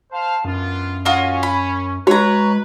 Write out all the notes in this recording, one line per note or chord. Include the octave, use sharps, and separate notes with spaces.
C5 F5 A5
F#2 B3 D4 F4
C#4 F4 F#4 D#5
B5
G#3 F#4 B4 C#5 A#5